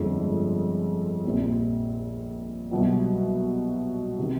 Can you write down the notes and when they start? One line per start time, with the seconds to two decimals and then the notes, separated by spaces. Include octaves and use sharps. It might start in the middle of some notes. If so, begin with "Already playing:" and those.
Already playing: G1 F2 D3 F3 G#3
1.24 A#1 A#2 G3 C4
2.71 C2 B2 F#3
4.19 C3 D#3